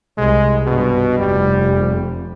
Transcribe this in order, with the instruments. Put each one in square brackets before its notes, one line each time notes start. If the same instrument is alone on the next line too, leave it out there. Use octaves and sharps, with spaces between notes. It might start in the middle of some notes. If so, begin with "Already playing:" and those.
[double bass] C2 [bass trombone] G#3
[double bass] G2 [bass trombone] B2
[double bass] F1 F2 [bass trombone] G3